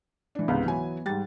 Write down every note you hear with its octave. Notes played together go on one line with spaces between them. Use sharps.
E3 D4
C#2 G#2 C3 B3
E3 F#3 G#5
G#2 G3 A6